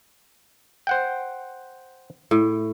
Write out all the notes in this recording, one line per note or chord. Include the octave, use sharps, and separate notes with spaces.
C5 F#5 G5
A2